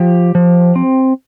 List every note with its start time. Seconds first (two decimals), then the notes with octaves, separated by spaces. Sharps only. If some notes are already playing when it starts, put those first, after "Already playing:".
Already playing: F3 G4
0.35 F3
0.76 C4